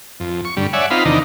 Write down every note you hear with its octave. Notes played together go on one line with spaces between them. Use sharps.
F2
C#6
G2 D3 G3
C#5 D5 E5 F#5 G#5
C4 D#4 F4 F5 B5
E2 C3 D#3 D4 D#4